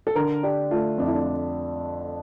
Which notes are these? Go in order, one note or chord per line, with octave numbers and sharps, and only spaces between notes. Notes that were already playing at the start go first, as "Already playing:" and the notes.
A4
D3 A#4
D4 G4
A3 F4
F2 D4
E4
D4